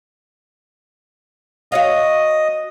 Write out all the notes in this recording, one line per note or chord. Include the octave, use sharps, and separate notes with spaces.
F#4 C#5 D#5 F5